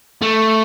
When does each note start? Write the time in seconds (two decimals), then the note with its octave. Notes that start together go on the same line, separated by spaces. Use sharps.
0.22 A3